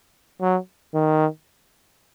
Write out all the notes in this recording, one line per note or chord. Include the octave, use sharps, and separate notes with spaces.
F#3
D#3